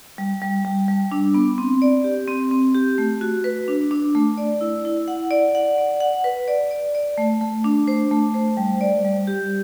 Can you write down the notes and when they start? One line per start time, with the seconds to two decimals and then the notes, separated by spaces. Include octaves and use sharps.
0.18 G3
0.42 G3
0.65 G3
0.88 G3
1.12 D4
1.34 B3
1.58 C4
1.82 D5
2.04 G4
2.28 C4
2.51 C4
2.74 G4
2.98 A3
3.21 F#4
3.44 B4
3.68 D4
3.91 D4
4.15 A3
4.37 D5
4.61 E4
4.85 E4
5.08 F#5
5.31 D5
5.55 F#5
5.78 D5
6.00 F#5
6.24 B4
6.48 D5
6.71 D5
6.95 D5
7.18 A3
7.41 A3
7.64 D4
7.88 C5
8.11 A3
8.34 C5
8.57 G3
8.81 D5
9.05 G3
9.27 G4